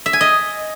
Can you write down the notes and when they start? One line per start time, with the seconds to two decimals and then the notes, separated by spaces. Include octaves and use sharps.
0.06 E5
0.13 G#5
0.21 D#5